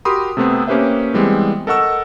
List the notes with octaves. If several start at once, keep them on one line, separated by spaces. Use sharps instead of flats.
F#4 G4 A#4 B5 C6 D#6
C3 A3 B3 C4
A#3 C#4 G4 B4 C5 E5
E3 G3 G#3 B3 C4
A4 A#4 D#5 F#5 C#6 E6